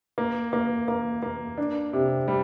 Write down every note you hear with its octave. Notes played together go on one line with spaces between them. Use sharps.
A#3
A#3
A#3
A#3
D4
C3
G3